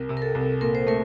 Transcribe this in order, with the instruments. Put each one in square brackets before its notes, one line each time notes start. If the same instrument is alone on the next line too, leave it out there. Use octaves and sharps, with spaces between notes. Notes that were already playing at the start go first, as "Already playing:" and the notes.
Already playing: [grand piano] C2 [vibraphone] A#4
[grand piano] C3
[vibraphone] A#4
A4
[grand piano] C2
[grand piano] A#2 [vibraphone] A#4
[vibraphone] C5
[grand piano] A3 [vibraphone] A#4